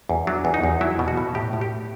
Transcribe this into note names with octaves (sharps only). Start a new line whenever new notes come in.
E2
F#3 D4
E2
D#4
E2
F#3 E4
B2
F#4
B2
A2 G4
A2
G4